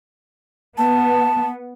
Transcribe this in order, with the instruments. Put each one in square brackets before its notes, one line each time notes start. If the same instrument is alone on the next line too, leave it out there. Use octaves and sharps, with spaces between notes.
[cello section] B3 [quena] A5